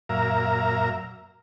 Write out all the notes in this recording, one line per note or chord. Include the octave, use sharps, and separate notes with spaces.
F#2 A#2 A#4 E5 F5 A#5